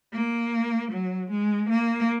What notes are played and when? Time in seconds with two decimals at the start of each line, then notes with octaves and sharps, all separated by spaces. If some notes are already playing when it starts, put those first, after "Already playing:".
0.13 A#3
0.91 F#3
1.30 G#3
1.69 A#3